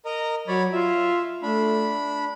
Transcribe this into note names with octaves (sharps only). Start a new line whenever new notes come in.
A#4 D#5 A#5
F#3 C#5 D5 B5
F4 E5
A3 D4 B5